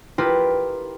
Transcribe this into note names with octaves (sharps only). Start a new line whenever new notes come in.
E4 F4 G4 A#4 B4